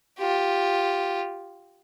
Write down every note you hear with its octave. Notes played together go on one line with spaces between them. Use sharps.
F4 G4